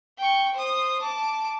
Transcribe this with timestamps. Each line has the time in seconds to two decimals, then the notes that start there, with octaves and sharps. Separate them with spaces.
0.18 G5 C#6
0.55 C5 D#6
1.01 A5 D6